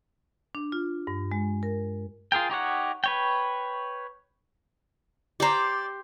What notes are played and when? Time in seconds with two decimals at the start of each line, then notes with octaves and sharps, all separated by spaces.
0.55 D4
0.72 F4
1.07 G2
1.32 G#3
1.63 A#4
2.32 F4 G#4 A#4 G5
2.50 D#4 G4 C#5 F#5
3.04 B4 C#5 G5
5.40 G4 C5 D5 A#5